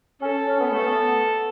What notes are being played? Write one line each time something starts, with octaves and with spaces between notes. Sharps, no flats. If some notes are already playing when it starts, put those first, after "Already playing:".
C#4 A4
C#4
B3
A3 A4
B3